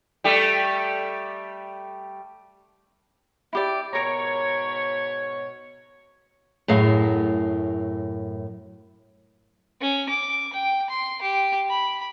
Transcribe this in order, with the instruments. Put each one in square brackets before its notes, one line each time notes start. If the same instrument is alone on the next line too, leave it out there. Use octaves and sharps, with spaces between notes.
[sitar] G3 A3 G4
[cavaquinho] E4 G4 D5
[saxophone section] G#2 B2 C#5 [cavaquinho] A#4 A#5
[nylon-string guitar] F#2 A2 G#4 F5
[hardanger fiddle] C#4
D6
G5
C6
G4
B5